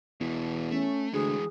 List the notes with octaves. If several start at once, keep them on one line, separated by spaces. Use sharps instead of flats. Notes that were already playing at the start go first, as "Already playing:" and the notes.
E2 B2 E3
A3 C#4
D2 E3 G#3 G#4